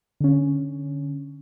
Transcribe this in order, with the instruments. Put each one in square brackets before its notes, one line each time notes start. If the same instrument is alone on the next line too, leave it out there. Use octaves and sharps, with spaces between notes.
[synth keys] D3 C#4